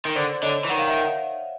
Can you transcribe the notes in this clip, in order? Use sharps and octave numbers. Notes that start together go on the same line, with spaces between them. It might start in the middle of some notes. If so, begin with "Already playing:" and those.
D#3
D3 C5 D5
D3 C#5 D#5
E3
D#3 F#5
F5
E5 F#5